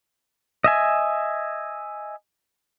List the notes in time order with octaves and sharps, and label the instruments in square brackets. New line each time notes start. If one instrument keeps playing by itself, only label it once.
[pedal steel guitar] D#5 E5 G#5